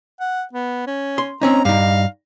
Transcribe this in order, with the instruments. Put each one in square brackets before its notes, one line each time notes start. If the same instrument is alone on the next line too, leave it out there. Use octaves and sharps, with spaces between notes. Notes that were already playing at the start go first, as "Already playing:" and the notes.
[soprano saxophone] F#5
B3
C#4
[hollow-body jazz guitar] C6
[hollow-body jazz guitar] C4 C#4 D#4 [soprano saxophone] A#5
[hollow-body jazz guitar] G2 D#4 [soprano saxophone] F5